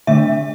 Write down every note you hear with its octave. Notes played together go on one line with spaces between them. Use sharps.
D3 A3 D4 E5